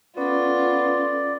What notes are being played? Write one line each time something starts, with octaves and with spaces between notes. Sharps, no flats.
B3 C#4 F4 A4 D5